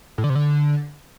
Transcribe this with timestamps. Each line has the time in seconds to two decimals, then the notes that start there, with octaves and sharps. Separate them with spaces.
0.18 A2
0.24 D3
0.30 C3
0.35 D3